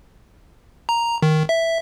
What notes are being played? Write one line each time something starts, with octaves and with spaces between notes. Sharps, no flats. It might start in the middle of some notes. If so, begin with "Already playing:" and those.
A#5
D#3
E5